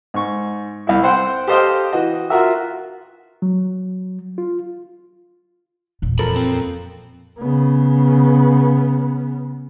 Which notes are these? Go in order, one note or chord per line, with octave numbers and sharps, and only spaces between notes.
G#2 C#6
C2 E4
C4 C5 F#5 G5
G4 A4 C5 D#5 F5 G5
E3 F#4 D#5
F4 F#4 A#4 E5
F#3
F4
E2 A#2
F2 A4 A#4 B5
C4
C#3 B3